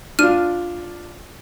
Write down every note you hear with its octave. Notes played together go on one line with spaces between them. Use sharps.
D4 F4 F6 D#7